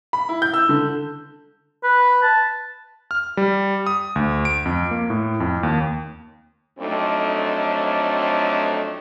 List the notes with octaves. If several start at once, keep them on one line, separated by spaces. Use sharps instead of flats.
B5
E4
G6
E6
D3
B4
A5
F6
G3
D#6
D2
D7
F2
A#3
A2
F2
D#2
F2 F#3 A3 C4 D4 D#4